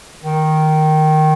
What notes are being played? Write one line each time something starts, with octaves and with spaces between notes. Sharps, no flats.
D#3